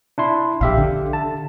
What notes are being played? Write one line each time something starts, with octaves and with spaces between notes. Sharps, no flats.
D4 E4 C6
A#1 G4 E5 F5
D3
A5